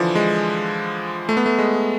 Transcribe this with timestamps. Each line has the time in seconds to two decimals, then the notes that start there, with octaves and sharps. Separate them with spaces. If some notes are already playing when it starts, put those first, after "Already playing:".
Already playing: D3 E3 F3
0.15 G#3
1.29 A3
1.37 B3
1.46 A3
1.59 G#3